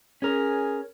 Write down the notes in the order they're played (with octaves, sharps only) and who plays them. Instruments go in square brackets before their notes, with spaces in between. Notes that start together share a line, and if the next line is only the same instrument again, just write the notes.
[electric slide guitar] C#4 A#4 [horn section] G#4